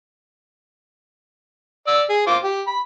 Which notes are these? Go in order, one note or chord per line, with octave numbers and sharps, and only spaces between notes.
D5 E6
G#4
F4 C5 D6
G4
B5